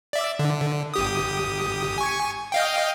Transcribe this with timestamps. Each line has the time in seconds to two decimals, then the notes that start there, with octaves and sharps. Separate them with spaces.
0.13 D5 E5
0.39 D3
0.94 G1 G4 D#6
1.98 G#5 C#6
2.52 D#5 F5 G5